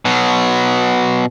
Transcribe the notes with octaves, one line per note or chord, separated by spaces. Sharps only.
B2 F#3